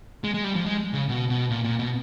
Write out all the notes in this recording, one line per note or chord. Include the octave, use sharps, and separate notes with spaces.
G#3
G#3
G3
F3
G#3
C#3
B2
B2
A#2
A#2
B2